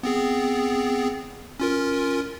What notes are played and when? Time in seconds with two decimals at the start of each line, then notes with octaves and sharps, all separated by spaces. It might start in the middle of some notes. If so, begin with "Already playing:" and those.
0.03 B3 C4 G#4
1.60 C#4 F4 A#4